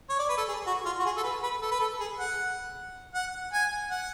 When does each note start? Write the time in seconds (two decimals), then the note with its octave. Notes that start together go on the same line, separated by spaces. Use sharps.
0.09 C#5
0.19 D5
0.29 B4
0.38 A4
0.48 G#4
0.66 F#4
0.85 F4
0.99 F#4
1.05 G#4
1.17 A4
1.24 B4
1.43 B4
1.62 A4
1.71 B4
1.80 A4
2.00 G#4
2.19 F#5
3.14 F#5
3.53 G#5
3.91 F#5